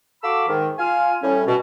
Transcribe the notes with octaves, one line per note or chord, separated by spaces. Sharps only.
F#4 A4 F5 B5 D6 E6
G#2 D#3
F4 F5 G#5
A2 G3 C#4
B2